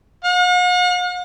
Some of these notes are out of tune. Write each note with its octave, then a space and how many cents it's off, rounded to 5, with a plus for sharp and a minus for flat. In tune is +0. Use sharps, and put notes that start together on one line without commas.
F#5 -45